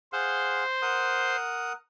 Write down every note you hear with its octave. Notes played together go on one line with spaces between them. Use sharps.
G#4 C5 F5 F#5
A#4 F#5 D#6